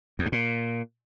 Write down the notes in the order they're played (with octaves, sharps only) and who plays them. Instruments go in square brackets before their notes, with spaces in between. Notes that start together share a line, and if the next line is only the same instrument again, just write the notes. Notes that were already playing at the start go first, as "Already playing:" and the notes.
[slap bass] E2
G2
A#2